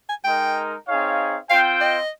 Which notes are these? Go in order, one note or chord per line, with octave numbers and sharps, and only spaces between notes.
G#5
G#3 D#4 A#4 G5
C4 D#4 G#4 C#5 F5
C4 F4 C5 F5 G5
D#5